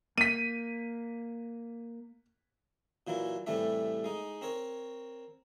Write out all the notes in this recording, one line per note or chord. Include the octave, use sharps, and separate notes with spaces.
A#3 B6 D#7
A#2 E3 F#3 E4
A2 C3 E3 G3 A3 E5
G#3 D#4
C4 A#4 C#5